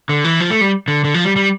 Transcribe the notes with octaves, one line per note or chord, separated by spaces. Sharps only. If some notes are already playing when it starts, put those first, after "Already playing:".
D3
E3
F3
A3
G3
D3
D3
F3
G3
G3